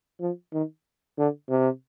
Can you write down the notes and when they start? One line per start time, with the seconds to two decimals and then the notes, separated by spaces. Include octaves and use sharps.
0.20 F3
0.53 D#3
1.18 D3
1.49 C3